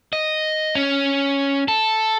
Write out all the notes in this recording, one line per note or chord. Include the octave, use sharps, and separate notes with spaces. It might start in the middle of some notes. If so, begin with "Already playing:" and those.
D#5
C#4
A4